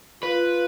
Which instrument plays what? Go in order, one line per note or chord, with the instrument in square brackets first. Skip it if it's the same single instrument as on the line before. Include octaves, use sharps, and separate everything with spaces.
[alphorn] F4 [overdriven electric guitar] B4